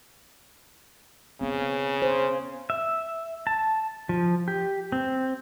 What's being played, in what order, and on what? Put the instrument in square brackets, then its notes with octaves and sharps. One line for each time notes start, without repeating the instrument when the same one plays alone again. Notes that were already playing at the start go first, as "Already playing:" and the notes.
[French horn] C#3 [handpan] B3 C4
[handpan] C5
[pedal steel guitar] E5
A5
F3
G4
C4